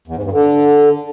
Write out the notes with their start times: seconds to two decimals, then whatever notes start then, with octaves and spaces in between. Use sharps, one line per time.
0.07 E2
0.16 G#2
0.24 G2
0.33 D3